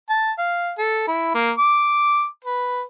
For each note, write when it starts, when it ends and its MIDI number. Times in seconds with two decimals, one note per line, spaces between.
0.09 0.32 81
0.38 0.71 77
0.78 1.06 69
1.08 1.30 64
1.35 1.51 58
1.58 2.26 86
2.45 2.82 71